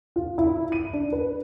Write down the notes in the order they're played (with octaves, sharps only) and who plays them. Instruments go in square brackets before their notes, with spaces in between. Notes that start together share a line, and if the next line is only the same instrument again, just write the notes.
[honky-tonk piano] F4
E4
D#7
D4
B4